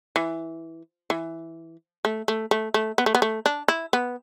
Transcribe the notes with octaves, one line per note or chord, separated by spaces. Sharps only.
E3
E3
A3
A3
A3
A3
B3
A3
B3
A3
D4
E4
B3